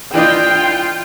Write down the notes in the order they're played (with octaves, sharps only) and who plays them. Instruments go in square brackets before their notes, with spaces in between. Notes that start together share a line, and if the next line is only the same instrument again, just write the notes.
[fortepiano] E3 D4 D#5 [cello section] F4 [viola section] G5